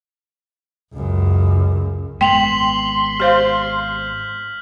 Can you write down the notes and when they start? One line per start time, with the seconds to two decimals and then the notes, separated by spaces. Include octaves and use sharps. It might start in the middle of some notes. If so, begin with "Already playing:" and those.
0.93 C#2 F#2
2.21 G#1 G#3 B3 G5 C6 B6 F7 F#7
3.20 G4 C5 F5 F6 G6